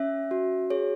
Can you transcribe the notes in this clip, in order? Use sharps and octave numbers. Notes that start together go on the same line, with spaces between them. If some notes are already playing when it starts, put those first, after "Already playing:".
Already playing: C#4 E5
F#4
G#4 C#5